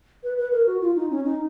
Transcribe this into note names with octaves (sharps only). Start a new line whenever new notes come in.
B4
B4
A#4
F#4
F4
D#4
C#4
D#4